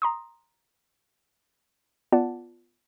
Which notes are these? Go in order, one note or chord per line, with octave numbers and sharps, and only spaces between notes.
A#5 C6 D#6
B3 F4 D5 F#5 A5